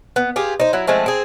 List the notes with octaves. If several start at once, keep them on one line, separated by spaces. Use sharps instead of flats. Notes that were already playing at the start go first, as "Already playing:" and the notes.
B3
F4 G4 G#4
D#4 C5
F#3 E4
F3 G#3 A3 C4
C4 G#4